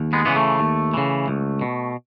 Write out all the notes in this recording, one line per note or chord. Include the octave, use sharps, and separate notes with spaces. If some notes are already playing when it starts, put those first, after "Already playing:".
Already playing: D#2
G#3 B3
C#3 E3 B3
A3
D#2
C#3 E3
C#2
B2